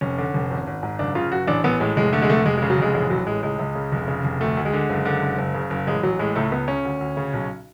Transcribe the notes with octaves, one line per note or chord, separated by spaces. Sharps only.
F1 C#4
D3
F1
G#1
G#1
G#2
F#1 D4
C#3 F4
F#1 F#4
A1 D4
A1 B3
A2 G#3
F1 G#3
D3 A3
G#3
F1 A3
F1 G#3
G#3
C#3
F#3
F1 G#3
A1 G#3
A1 F#3
A2 G#3
C#2 G#3
C#2
C#3
F1
C#3
F1
D2 A3
D2
G#3
D3
F#1
D3
F#1
F#1
C#3
F#1
A1 G#3
A1 F#3
A2 G#3
C#2 A3
C#2 B3
C#3 C#4
D2
D2
C#3
B1